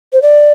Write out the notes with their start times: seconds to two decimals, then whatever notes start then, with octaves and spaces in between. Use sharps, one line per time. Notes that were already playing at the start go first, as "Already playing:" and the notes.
0.13 C5
0.22 D5